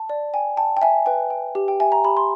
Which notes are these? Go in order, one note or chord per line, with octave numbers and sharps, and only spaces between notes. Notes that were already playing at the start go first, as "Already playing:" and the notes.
Already playing: A5
D5
G5 G#5
G5 A5
G5
E5 G#5
B4 G5
G5
G4
G5
E5 G#5
A#5
G4 B5
C6